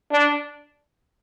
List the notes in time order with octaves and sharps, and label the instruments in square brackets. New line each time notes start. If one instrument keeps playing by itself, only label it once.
[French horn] D4